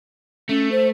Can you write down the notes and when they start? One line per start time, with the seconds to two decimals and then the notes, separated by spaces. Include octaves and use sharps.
0.49 A3 C#4
0.72 C5